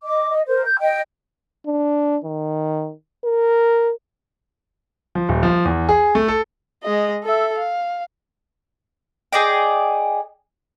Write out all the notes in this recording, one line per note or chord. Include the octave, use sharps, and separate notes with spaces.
D#5 D6
D#5
A#4 C5
G6
D#5 G5
D4
D#3
A#4
F3
D#1
F3
E2
G#4
A3
A4
G#3 D#5
A4 E5
F5
G#4 D5 D#5 G5